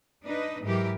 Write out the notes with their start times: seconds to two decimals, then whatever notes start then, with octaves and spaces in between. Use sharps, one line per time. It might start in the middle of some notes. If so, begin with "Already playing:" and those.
0.25 D4 D#4 B4 D#5
0.63 G#2 E3 F#3 G4 A#4